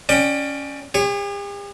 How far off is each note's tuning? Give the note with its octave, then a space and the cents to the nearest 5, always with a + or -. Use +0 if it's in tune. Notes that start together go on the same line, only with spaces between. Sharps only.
C#4 +10 D5 +25 G5 -10
G4 +45 C#5 -10